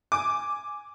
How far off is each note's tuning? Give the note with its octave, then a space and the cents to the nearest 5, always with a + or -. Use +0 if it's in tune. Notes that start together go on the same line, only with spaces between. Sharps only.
G#5 +0 D6 +0